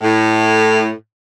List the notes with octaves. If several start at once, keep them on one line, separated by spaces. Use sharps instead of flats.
A2